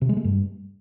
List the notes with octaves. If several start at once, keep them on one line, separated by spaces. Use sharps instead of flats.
C3
G#3
A3
G2